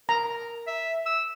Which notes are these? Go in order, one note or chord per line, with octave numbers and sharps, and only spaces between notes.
A#4 A#5
E5
E6